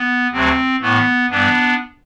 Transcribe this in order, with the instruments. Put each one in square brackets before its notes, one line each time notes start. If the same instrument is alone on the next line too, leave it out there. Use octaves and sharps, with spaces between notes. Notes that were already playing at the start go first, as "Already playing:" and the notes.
Already playing: [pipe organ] B3
D2 C3 F#3 A3 C4
A2 E3 A3 B3
G2 E3 G3 B3 D4